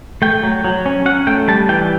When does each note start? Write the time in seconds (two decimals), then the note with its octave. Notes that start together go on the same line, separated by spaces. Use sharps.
0.22 A3 G5
0.43 F#3
0.64 F#3
0.86 C#4
1.06 C#4 F#5
1.27 A3 G5
1.48 G3 A5
1.69 E3 G5